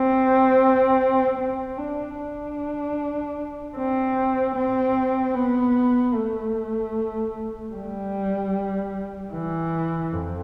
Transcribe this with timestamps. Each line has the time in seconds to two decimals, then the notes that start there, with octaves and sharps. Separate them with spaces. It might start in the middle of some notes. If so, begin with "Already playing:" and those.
Already playing: C4
1.38 C4
1.78 D4
2.18 D4
3.77 C4
4.56 C4
5.35 B3
6.15 A3
7.74 G3
9.33 E3
10.13 F2